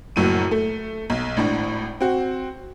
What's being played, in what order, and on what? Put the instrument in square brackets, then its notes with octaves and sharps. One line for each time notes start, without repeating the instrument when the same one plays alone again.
[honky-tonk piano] F#1 F#2 A2 D#7
A3
B1
G#1 A2 D4
C4 F#4